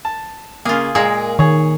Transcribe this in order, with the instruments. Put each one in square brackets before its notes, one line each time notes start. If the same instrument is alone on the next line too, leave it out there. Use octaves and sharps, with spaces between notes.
[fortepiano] A5
[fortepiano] C#3 A#3 [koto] F4 G#4
[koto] A#2 A#3 [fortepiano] G#3 G#4
[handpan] D#3 [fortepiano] G#4 C#5